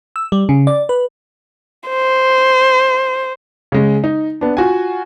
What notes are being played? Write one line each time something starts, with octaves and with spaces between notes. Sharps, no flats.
E6
G3
C#3
D5
B4
C5
C#3 G#3
D#4
B3 D4
F4 F#4 G#5